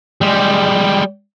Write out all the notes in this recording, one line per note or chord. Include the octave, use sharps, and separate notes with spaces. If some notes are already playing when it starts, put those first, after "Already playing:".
G3 G#3